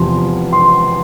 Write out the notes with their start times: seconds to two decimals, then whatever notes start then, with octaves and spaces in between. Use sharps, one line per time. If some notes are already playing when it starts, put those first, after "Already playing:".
Already playing: E2 C3 F3 C6
0.53 C6